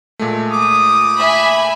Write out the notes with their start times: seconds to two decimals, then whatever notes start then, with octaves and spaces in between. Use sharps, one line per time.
0.19 A#2 G#3 A3
0.52 D6 D#6
1.17 E5 G#5 B5